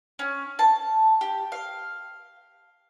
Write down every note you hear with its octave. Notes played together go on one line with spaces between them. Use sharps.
C#4
A5
G4
F5